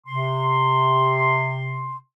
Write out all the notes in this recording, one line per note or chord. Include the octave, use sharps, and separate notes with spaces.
C3 C6